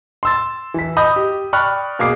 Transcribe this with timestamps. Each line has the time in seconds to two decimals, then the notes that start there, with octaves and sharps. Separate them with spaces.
0.23 C6 E6 A6
0.74 E3 B6
0.97 D#5 B5 D#6 G6
1.16 G4
1.53 D5 G5 B5 C#6 F6 F#6
1.99 B2 A#3 G#4 D6 C7